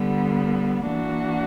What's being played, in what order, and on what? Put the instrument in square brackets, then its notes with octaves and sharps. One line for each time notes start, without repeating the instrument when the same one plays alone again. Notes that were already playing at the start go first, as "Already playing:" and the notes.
Already playing: [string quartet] D3 G3 B3
E3 A#3 D4 F#4